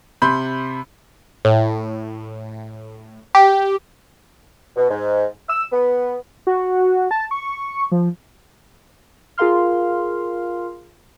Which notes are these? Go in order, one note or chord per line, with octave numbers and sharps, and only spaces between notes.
C3 B5 C6 G6
A2
G4
B2
G#2
E6
B3
F#4
A5
C#6
F3
F4 G#4 A#4 F5 C6 F6